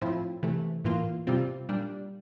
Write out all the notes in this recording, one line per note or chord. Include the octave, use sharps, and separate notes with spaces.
A2 F3 C4 E4
C3 E3 A3
A2 E3 A#3 F4
C3 G3 C4 F4
A#2 G3 D4